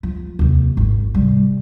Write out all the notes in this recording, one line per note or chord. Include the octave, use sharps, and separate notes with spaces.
F3
D#2 C3
G#1
C3 G3